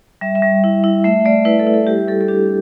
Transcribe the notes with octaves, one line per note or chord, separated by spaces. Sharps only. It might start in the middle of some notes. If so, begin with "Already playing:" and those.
G3 E5
E5
G3
E4
E4
A3 E5
A3 D5
E4 B4
A4
E4
A4
G3 G4
G3 A4
A4
D4 G4